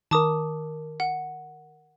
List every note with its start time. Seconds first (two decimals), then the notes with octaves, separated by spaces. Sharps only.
0.11 D#3 A#4 A5 D6 D#6
1.00 F#5